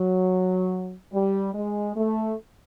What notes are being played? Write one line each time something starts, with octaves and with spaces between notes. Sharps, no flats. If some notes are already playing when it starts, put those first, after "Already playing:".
Already playing: F#3
G3
G#3
A3